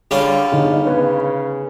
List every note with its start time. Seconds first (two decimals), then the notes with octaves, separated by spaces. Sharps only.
0.11 D3 G3 C#4 F4 G#4
0.52 G1 D3 D#4 G#4
0.85 C#3 B3 B4 C#5